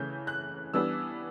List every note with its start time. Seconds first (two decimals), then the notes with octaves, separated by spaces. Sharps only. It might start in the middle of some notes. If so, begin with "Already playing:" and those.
Already playing: C#3 E3 A3 C#4 G6
0.27 F#6
0.74 E3 G3 B3 D4 E6